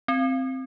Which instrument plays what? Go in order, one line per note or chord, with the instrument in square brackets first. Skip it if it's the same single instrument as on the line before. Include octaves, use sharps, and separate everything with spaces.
[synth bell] C4